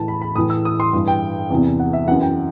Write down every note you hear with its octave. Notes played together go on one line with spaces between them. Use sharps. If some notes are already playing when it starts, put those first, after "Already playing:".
Already playing: A2 E3 A5
B5
B5
A2 E3 D#6
E6
D#6
C6
G2 E3
G5
E2 C3 E3
F#5
E5
F#2 E3 F#5
G5